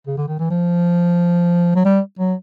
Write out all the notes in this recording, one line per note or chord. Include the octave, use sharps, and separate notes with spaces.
C#3
D3
D#3
E3
F3
F#3
G3
F#3